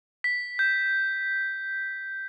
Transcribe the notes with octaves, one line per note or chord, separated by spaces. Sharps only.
B6
G6